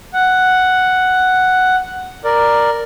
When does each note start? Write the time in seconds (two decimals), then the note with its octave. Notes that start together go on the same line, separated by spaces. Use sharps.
0.13 F#5
2.25 A#4 D5